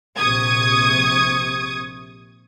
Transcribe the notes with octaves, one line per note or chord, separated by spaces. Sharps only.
A#1 C3 C#6 D#6 G#6